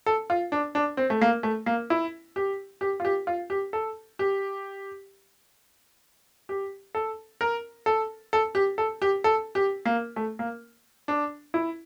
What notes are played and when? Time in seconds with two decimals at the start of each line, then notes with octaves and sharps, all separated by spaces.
0.06 A4
0.30 F4
0.52 D4
0.75 D4
0.97 C4
1.10 A3
1.22 A#3
1.43 A3
1.66 A#3
1.90 E4
2.36 G4
2.81 G4
3.00 F4
3.05 G4
3.27 F4
3.50 G4
3.73 A4
4.19 G4
6.49 G4
6.95 A4
7.41 A#4
7.86 A4
8.33 A4
8.55 G4
8.78 A4
9.02 G4
9.24 A4
9.55 G4
9.86 A#3
10.16 A3
10.39 A#3
11.08 D4
11.54 E4